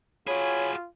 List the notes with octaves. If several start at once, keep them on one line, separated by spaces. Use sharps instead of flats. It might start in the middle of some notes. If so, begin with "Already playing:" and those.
F4 F#4 G#4 C#5 G#5 B5